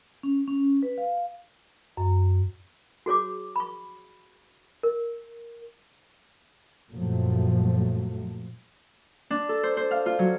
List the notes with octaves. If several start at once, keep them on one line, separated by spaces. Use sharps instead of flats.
C#4
C#4
B4
F5
F#2
F#4 G#4 C#5 D6
B5 C#6
A#4
F#2 A#2 F3 F#3 A3
D4
A4
C5
C5
F5
F4
F#3